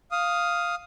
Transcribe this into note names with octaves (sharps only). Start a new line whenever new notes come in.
F5 D#6